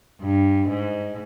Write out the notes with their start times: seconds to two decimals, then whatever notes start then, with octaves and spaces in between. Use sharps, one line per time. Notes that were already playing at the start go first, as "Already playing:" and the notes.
0.22 G2
0.69 G#2